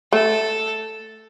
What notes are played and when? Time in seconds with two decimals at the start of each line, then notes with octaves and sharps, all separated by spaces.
0.13 A3 A4